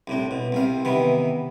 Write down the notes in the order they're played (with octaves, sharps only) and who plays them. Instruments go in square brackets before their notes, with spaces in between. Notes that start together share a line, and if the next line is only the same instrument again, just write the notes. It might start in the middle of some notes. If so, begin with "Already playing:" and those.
[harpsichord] C2 A2 D4
B2
C2 C3 F5
C3 D#3 E3 B3